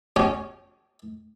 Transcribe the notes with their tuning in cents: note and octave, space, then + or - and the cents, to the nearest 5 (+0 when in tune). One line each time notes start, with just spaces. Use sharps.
C#4 +0 G4 -40